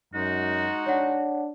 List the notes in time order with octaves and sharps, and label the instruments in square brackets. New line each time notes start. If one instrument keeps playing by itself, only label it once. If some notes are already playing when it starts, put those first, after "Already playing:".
[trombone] F#2 [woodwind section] G#3 D#4 F#4
[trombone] D4 [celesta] C#5 F#5